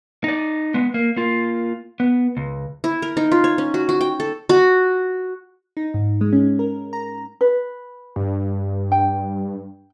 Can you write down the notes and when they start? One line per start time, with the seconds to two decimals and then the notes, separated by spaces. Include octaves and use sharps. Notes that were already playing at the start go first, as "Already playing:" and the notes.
0.24 D#4 D5
0.74 G#3 B3
0.94 A#3
1.17 A#3 F4
2.00 B3
2.37 C#2
2.84 E4
3.02 A#4
3.17 D#4
3.32 F4
3.44 C#5
3.58 C#4
3.74 F#4
3.89 F#4
4.01 G5
4.20 A4
4.49 F#4
5.77 D#4
5.94 G#2
6.21 G#3
6.33 C#4
6.59 A#4
6.93 A#5
7.41 B4
8.16 G2
8.92 G5